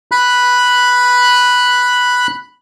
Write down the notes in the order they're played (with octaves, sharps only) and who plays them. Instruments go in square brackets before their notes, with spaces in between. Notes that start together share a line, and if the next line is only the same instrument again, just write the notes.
[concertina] B5 F#6